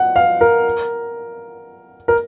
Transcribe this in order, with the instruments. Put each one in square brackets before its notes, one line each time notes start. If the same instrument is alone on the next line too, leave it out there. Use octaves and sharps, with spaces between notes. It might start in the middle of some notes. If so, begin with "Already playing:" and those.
Already playing: [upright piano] F#5
F5
A#4
A#4